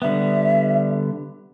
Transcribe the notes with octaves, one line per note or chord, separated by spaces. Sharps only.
D3 G3 B3 E5